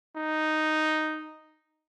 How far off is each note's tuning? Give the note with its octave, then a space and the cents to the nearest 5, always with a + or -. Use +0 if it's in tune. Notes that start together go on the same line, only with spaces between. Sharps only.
D#4 -5